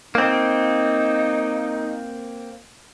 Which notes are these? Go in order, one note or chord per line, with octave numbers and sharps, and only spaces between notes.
A#3 C4 D#4